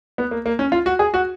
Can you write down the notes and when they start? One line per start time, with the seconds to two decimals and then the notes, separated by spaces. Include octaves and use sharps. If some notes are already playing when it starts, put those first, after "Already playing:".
0.18 B3
0.31 A#3
0.46 A#3
0.59 C#4
0.72 F4
0.86 F#4
0.99 G#4
1.14 F#4